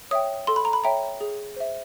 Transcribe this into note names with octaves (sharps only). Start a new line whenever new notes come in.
C#5 E5 G5 D#6
A4 C6
B5
A#5
B5
C#5 E5 G5 A#5
G#4
C5 E5